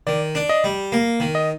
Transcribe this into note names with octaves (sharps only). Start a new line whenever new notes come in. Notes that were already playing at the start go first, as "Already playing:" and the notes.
D#3 D5
D4
D#5
G3
A#3
D#3
D#5